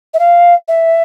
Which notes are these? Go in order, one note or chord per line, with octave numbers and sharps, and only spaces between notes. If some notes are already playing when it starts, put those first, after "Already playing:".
E5
F5
E5